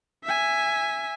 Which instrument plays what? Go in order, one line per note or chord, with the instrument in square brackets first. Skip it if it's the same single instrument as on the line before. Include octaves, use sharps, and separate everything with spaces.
[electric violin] E5 G#5